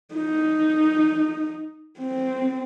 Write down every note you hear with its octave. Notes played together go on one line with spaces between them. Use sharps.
D#4
C4